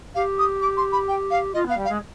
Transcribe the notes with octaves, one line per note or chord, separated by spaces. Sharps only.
G4 F5
D#6
D6
C6
B5
G5
F5
F4 D#5
B3 F5
G3
F5
G#3